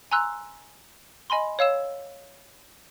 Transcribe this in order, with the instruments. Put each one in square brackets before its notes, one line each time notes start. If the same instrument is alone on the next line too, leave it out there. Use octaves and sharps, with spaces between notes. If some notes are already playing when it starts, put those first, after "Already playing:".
[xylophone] G#5 A#5 C6 E6 F#6
D#5 G#5 B5 C6
C#5 F5 E6 E7